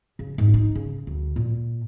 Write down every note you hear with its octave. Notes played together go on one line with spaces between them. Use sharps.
C#3
G#2
D#4
C#3
D2
A#2